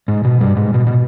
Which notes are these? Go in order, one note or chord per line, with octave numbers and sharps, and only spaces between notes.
G#2
B2
G2
G#2
B2
B2